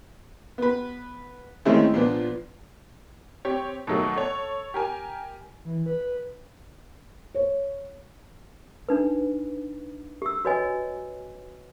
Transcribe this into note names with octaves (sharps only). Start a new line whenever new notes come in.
B3 B4
D#3 G#3 A3 C4 C#4 E4
A#2 F3 B3 D4
C4 G4 C#5
B2 D#3 F#3 A3 A#3
A4 C#5
G4 A#4 G#5
E3
B4
C#5
D4 D#4 B4
G4 E6
F#4 B4 C#5 D#5 G#5